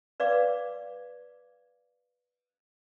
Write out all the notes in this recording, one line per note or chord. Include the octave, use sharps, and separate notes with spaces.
B4 D5 F5 D6